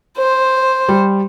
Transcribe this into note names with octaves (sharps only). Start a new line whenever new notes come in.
C5
G3